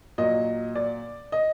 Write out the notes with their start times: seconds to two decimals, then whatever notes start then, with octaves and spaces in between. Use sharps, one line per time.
0.18 A#2 F#3 D#5
0.75 D5
1.32 D#5